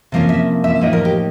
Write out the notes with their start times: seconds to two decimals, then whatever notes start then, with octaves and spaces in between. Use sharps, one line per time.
0.12 C3 F3 A#3 C#4
0.29 E5
0.64 E5
0.81 A2 F3 A#3 D#4 D#5
0.93 A#4
1.05 G4